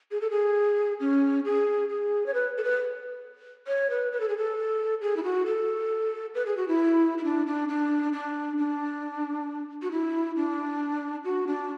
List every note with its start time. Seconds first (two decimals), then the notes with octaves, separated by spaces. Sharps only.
0.11 G#4
0.21 A4
0.30 G#4
1.00 C#4
1.45 G#4
1.89 G#4
2.26 C#5
2.34 B4
2.58 A4
2.64 B4
3.67 C#5
3.90 B4
4.12 B4
4.20 A4
4.29 G#4
4.38 A4
5.01 G#4
5.17 E4
5.23 F#4
5.46 A4
6.35 B4
6.46 G#4
6.57 F#4
6.68 E4
7.18 E4
7.24 D4
7.47 D4
7.69 D4
8.13 D4
8.58 D4
9.82 F#4
9.91 E4
10.36 D4
11.24 F#4
11.47 D4